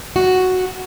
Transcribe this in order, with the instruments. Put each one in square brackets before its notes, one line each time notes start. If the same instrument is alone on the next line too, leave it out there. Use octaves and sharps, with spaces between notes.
[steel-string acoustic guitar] F#4